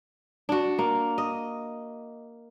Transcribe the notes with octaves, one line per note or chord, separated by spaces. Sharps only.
D4 F#4
A#3
D#5